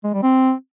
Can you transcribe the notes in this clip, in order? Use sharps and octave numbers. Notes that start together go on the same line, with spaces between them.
G#3
G3
C4